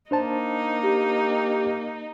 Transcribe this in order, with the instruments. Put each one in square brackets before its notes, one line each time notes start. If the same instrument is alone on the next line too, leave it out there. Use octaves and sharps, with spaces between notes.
[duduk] A#3 [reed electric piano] D4 C5 A5 [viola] D#4
[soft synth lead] G4